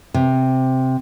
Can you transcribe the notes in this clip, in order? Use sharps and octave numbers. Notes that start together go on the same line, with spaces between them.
C3